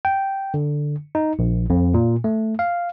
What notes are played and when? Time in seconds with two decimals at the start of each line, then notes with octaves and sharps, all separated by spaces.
0.05 G5
0.54 D3
1.15 D#4
1.39 A#1
1.70 F2
1.94 A#2
2.24 A3
2.59 F5